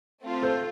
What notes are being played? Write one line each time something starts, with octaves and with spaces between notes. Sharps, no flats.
A3 C4 F4
A4 C5